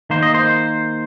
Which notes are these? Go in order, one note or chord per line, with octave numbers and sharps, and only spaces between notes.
D#3 A#3 C5
D#5
C5